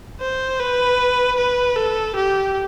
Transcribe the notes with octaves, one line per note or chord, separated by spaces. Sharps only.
C5
B4
B4
A4
G4